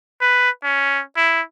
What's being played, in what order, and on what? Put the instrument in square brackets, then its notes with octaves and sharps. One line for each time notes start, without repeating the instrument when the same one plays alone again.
[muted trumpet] B4
C#4
E4